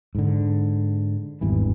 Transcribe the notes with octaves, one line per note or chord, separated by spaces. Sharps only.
G#2 D3
G#1 E2 G2 E3